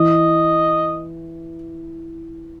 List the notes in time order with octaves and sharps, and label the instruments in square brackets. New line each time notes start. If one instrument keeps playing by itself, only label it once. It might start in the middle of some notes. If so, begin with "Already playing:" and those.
Already playing: [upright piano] E3 [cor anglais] D#5